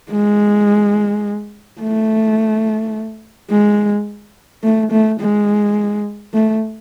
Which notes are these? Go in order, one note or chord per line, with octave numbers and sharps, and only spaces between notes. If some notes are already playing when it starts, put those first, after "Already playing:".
G#3
A3
G#3
A3
A3
G#3
A3